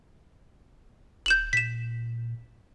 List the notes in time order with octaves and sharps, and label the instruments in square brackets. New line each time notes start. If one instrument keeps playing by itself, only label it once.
[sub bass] D#1 [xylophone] G6 E7 F#7
[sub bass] A#2 [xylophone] B6 E7